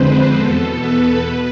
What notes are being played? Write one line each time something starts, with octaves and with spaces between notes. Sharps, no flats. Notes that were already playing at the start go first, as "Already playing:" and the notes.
Already playing: F2 D3 G#3 C4 B4 C5
E2 B2 B3 A4
B4
B2